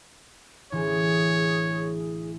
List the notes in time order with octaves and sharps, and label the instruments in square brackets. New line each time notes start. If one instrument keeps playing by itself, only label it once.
[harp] A1 D3 E3 [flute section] G#4 [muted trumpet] C#5